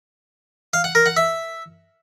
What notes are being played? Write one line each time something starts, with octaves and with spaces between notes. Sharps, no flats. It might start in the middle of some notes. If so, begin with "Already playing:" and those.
F5
F#5
A#4
F#5
E5